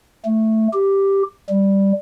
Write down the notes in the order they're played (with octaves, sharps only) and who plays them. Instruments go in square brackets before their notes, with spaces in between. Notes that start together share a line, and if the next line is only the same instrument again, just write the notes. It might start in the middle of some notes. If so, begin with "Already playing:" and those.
[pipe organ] A3
G4
G3